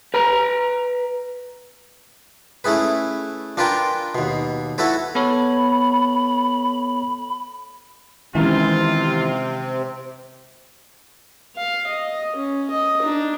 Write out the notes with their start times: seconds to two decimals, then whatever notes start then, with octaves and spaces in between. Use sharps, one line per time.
0.14 B4 A#5
2.64 A3 C#4 E4 G#4 B4
3.57 D4 F4 A#4 B4 G5 G#5
4.15 D#2 B2
4.78 E4 F#4 A4 B4 C#5
5.15 B3 A4 C#5 B5
8.35 C3 D#3 E3 G#3 C4 C#4 F4 A#5
11.56 F5
11.88 D#5
12.36 C#4
12.71 D#5
13.02 D4 D#4